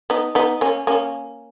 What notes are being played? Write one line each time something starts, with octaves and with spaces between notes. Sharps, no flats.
B3 D#4
B3 D#4
A#3 C#4
A#3 C#4